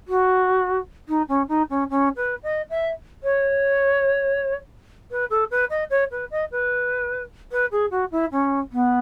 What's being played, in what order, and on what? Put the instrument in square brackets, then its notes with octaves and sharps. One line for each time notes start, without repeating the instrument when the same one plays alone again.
[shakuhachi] F#4
D#4
C#4
D#4
C#4
C#4
B4
D#5
E5
C#5
B4
A4
B4
D#5
C#5
B4
D#5
B4
B4
G#4
F#4
E4
C#4
B3